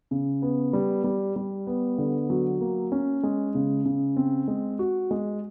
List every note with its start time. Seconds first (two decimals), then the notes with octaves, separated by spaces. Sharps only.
0.11 C#3
0.42 B3
0.73 G3
1.04 G3
1.36 G3
1.67 B3
1.98 D3
2.30 F#3
2.61 A#3
2.92 C#4
3.23 G#3
3.55 C#3
3.85 C#3
4.17 C4
4.48 G#3
4.79 F#4
5.11 G#3